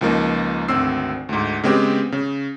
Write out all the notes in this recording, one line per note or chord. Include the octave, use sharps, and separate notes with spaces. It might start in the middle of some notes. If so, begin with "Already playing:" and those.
C#2 F3 A#3 D#4
G#1 D2 C4 E6 C7
D2 G#2
C#3 G#3 B3 C4 G4
C#3